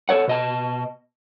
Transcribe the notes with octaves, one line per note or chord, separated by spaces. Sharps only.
A4 A#4 C#5 F#5
B2 D#5 A5